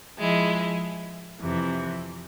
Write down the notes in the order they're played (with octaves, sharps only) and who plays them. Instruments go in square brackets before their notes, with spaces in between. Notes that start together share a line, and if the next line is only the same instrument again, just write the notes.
[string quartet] F3 G#3 E4
F2 C3 E3